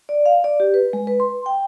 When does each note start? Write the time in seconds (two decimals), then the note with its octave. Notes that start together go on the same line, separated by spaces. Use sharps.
0.09 D5
0.26 F5
0.44 D5
0.60 G4
0.74 B4
0.93 G#3
1.07 B4
1.20 C6
1.46 G5